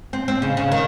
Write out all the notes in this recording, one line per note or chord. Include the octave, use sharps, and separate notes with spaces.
C4
C4
C#3
C#3
D#3